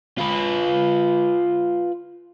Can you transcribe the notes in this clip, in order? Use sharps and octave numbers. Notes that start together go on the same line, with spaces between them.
F4 B4